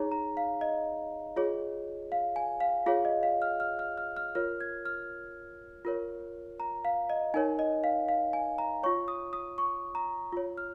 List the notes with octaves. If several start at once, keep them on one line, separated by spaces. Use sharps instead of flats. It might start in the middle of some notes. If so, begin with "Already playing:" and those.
Already playing: D#4 G#4 C#5 A#5
A#5
F5
D#5
F4 G#4 C#5
F5
G#5
F5
F4 G#4 C#5 F5
D#5
F5
F6
F6
F6
F6
F6
F4 A#4 C#5 F6
G#6
F6
F4 A#4 C#5
A#5
F5
D#5
D#4 A#4 C#5 G#5
D#5
F5
F5
G#5
A#5
F4 C#5 C#6
D#6
D#6
C#6
A#5
F4 C#5
F6